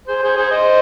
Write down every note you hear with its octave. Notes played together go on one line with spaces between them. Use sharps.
G#4 C5
G#4 C5
G#4 C5
C5 D#5